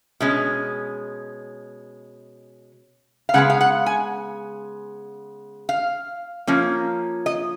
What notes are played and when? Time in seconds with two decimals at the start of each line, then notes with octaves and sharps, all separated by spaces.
0.20 B2 G#3 C#4
3.29 F5
3.34 C#3 G#3 B3 F#5
3.50 F5
3.61 F#5
3.86 G#5
5.69 F5
6.47 F3 A#3 C#4
7.26 D#5